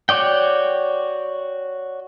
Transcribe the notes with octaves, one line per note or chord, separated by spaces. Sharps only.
F#4 C#5 D5 G5